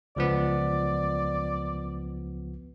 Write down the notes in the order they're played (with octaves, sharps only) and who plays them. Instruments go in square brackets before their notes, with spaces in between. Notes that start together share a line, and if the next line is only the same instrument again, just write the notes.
[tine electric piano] C#2 F3 B3 [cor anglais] D5